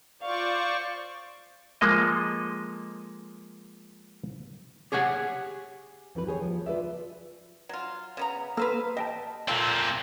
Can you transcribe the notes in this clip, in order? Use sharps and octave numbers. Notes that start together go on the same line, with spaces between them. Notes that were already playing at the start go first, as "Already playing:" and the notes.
F4 C5 D5 F5 C#6
F3 G#3 A#3 A4 D#5
G4 G#4 C#5 F#5 G#5
F2 E3 F#3 B4
G4 G#4 C5 C#5
F3
F4 B4 D5 E5
F#3 F4
C#3 B3 A#5
A#3 A4 B4 C5 F5 A#5
G4 D#5 G5 A5
A#2 C4 F4 A4 E5